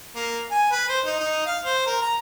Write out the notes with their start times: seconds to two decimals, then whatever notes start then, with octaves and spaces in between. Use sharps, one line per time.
0.15 A#3
0.51 G#5
0.71 B4
0.89 C5
1.05 D#4
1.19 D#4
1.46 F5
1.65 C5
1.86 A#4
2.02 A#5